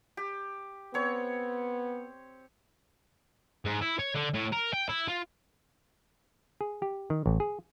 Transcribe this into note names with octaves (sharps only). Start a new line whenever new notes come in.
G4
B3 C4 C#5
G#2
E4
C#5
D3
A2
A#4
G5
E4
F4
G#4
G4
D#3
A1
G#4